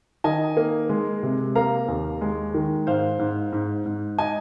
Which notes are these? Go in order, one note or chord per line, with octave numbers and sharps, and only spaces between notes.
D#3 D#5 G#5
A#3
G#3
C3
A#3 F5 A#5
D#2
G#3
D#3
G#2 C5 F5
G#2
G#2
G#2
D#5 G#5